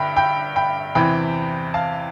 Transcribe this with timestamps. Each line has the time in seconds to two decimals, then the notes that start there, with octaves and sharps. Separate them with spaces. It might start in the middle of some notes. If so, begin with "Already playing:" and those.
Already playing: G2 D3 E5 G5 B5
0.16 G5 B5
0.56 G5 B5
0.95 E2 C3 E3 G5 B5
1.74 F5 A5